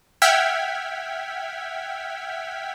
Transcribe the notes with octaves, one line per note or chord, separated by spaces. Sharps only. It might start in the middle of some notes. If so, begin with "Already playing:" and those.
E5 F#5 G5 F6 G#6 B6